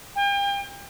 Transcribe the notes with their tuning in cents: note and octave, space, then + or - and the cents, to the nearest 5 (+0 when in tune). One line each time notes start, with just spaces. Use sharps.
G5 +40